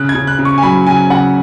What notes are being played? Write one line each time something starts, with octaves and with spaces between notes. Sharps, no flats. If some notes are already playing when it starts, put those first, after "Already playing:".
Already playing: C#3 F#6
G#6
C#3
F#6
C#3
C#6
G#5
F#3 B5
C#3 G#5
C#3 F#5